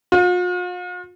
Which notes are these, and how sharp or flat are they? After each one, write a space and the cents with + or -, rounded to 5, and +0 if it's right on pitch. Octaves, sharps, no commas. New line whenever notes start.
F4 +45